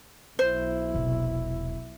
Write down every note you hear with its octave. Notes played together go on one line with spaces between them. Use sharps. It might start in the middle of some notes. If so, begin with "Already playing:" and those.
B1 E4 C5
E1 C3